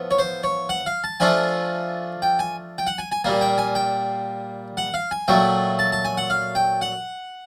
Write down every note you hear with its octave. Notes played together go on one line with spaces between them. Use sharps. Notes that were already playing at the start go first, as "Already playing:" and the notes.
Already playing: A2 F3 B3
C#5
C5
C#5
F#5
F5
A5
F3 A3 D4 F4 G#5
G5
G#5
G5
F#5
G#5
G#5
A#2 G3 A#3 G#5
G5
G#5
G5
F#5
F5
G#5
A#2 F#3 A3 G5
A5
A5
G#5
F#5
F5
G5
F#5